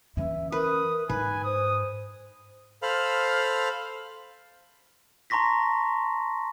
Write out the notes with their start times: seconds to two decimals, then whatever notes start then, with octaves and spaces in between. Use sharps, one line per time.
0.17 E3 C#4 E5
0.52 A#4 B4 D#6
1.09 G#2 D#4 B4 G#5
1.43 C5 D#6
2.82 A4 C5 F5 B5 F6
5.30 A5 A#5 C6 C#6 A#6 B6